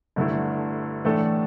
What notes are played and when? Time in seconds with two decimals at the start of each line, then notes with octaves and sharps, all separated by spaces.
0.16 G1 G2 D3 A3 E4
1.05 A2 E3 A3 D4 A4